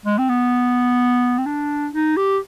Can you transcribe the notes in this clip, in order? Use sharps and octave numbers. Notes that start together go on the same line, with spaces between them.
G#3
C4
B3
C4
D4
D#4
G4